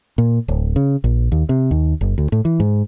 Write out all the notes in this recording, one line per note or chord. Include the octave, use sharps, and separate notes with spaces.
A#2
D1
C#3
A#1
D#2
C3
D#2
F#1
D2
A2
E3
G#2